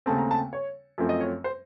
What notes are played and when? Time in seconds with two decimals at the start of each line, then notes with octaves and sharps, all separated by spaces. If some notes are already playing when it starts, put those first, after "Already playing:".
0.06 D#2 C#3 A3 C4 A5
0.18 A#5
0.31 A5
0.53 C#5
0.98 F#2 F3 A3 C4
1.09 D#5
1.20 C#5
1.44 C5